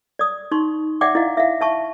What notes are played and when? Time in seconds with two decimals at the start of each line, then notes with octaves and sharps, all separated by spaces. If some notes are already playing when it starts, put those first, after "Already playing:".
0.19 D5 D#6
0.51 D#4 C6 C#6
1.01 D5 E5 F#5 G5 D6
1.15 E4 D#5 F5
1.37 E5 F5
1.61 E5 A5 C#6